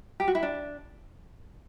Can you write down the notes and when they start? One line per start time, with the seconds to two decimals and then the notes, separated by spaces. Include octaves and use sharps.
0.20 G4
0.28 F#4
0.35 E4
0.43 D4